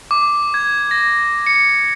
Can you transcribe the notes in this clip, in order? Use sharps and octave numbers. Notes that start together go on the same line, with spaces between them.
D6
G#6
A#6
C#7